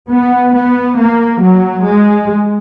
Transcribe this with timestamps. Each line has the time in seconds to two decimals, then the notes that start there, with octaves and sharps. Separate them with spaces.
0.10 B3
0.54 B3
0.98 A#3
1.41 F#3
1.84 G#3